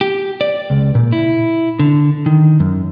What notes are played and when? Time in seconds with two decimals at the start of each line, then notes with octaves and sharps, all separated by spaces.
0.01 G4
0.41 D5
0.70 C#2
0.95 A#2
1.12 E4
1.79 D3
2.26 D#3
2.60 F#2